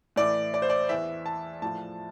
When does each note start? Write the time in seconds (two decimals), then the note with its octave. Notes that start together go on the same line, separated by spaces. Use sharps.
0.16 A2 E3 D5
0.54 D5
0.62 C5
0.69 D5
0.89 E2 E3 E5
1.26 A5
1.62 A2 F3 A5